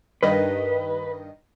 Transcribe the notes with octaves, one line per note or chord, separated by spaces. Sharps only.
G2 D#3 B4 D#5